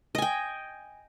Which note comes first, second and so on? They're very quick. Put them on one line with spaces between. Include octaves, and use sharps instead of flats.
D#5 G#5 G5